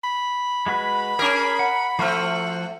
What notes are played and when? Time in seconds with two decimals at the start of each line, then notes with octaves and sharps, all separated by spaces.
0.04 B5
0.66 G#3 F#4 B4
1.19 C#4 G#4 A#4 F6
1.59 F#5
1.99 F3 A3 C4 F#4 F6